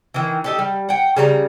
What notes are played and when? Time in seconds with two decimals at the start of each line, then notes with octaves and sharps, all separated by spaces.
0.14 D#3 E3
0.44 D#4 G4 A4
0.59 G3
0.89 F#5 G5
1.16 C#3 G3 C5 A#5